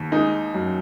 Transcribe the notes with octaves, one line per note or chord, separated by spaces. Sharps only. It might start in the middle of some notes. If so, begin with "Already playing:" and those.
Already playing: D#2
G#3 D#4
F#2